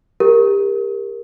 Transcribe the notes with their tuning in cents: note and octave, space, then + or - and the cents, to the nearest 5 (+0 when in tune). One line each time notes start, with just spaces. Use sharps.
G4 +30 A#4 +0